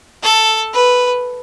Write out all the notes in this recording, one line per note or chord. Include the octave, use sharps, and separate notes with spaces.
A4
B4